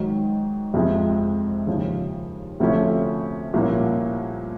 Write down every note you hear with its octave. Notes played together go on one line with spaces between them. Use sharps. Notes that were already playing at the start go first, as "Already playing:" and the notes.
Already playing: G#2 D#3 F#3
F2 C3 F3 G#3
D#2 C#3 F3
D2 C3 F3 A3 C#4
C2 A#2 F3 A#3 C#4